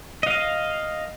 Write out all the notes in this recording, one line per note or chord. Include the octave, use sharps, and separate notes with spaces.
D#5 F5